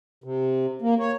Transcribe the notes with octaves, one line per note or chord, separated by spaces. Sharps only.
C3
A#3
C#5